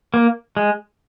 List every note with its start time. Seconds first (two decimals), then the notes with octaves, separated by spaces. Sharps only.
0.14 A#3
0.57 G#3